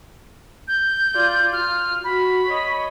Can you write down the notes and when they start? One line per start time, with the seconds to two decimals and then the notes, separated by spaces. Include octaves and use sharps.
0.68 G6
1.15 F4 D5
1.53 F4 F6
2.04 F#4 B5
2.50 C#5 D#5